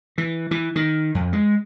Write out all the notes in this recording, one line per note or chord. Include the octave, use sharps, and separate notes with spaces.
E3
E3
D#3
F2
G#3